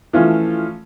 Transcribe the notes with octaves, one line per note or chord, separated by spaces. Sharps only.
E3 F3 A3 C#4 F4